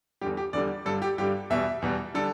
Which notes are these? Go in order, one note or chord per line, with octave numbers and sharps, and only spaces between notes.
E2 D3 G3 G4
G4
E2 D3 G3 D5
G2 D3 G3 A4
G4
G2 D3 G3 G4
E2 B2 G3 E5
E2 B2 G3
D3 G3 A4